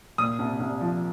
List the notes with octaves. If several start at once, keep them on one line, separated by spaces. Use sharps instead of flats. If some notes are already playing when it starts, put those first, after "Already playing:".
A#2 D#6
C2
C2
F3